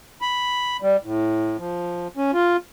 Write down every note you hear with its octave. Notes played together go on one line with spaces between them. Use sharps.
B5
G3
A2
F3
C#4
F4